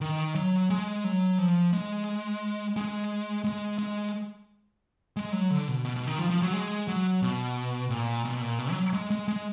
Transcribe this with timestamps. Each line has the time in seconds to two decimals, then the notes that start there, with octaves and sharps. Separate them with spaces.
0.01 D#3
0.35 F#3
0.70 G#3
1.04 F#3
1.38 F3
1.73 G#3
2.76 G#3
3.44 G#3
3.78 G#3
5.17 G#3
5.32 F#3
5.51 D3
5.68 B2
5.85 B2
5.96 B2
6.07 D#3
6.19 F3
6.30 F3
6.42 F#3
6.53 G#3
6.88 F#3
7.22 B2
7.90 A#2
8.25 B2
8.42 A#2
8.59 B2
8.71 F#3
8.93 G#3
9.10 G#3
9.28 G#3